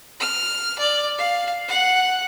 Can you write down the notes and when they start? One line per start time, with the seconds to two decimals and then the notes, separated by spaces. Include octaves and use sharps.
0.20 F6
0.78 D5
1.18 F5
1.68 F#5